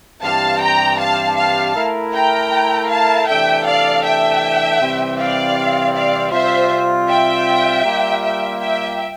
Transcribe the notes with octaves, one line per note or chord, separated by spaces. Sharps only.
G2 E3 G3 C4 G4 F5 A5
G5 A#5
F5 A5
F5 A5
A3 E4 A#4
G5 A#5
F5 A5
C3 E3 A3 D4 A4 E5 G5
D5 F5
E5 G5
C3 E3 G3 C4
D5 F5
D5 F5
C3 G3 C4 F4 C5 E5
E5 G5
G3 A#3 F4
E5 G5
E5 G5